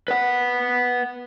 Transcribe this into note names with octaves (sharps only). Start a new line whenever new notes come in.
B4 F#5